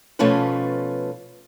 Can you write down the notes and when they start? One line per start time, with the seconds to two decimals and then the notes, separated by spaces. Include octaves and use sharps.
0.19 B2 F3 A3 C#4 F4 B4